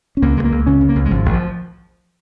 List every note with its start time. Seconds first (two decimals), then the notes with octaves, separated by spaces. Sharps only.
0.17 C#4
0.22 C#2 A#3
0.37 C#2 G#3
0.44 A#3
0.52 C#2
0.66 C#3 C#4
0.81 C#3
0.89 A#3
0.95 C#2
1.06 G#3
1.10 G#1 F3
1.25 G#1
1.33 F3